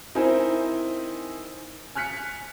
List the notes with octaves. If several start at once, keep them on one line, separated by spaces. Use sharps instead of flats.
C4 D#4 E4 A#4 C5 G#5
G#5 F6 F#6 B6 C#7